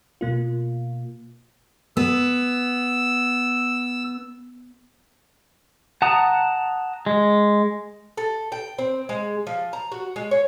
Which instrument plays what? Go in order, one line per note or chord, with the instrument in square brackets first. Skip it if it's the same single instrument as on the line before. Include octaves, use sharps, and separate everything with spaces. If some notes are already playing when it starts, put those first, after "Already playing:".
[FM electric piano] B2 A#3 F4
[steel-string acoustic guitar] B3 [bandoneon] E6
[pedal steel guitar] F#5 A5 A#5 D#6
G#3
[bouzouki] A4
G5
C4
G#3
F3
A#5
F#4
G#3
C#5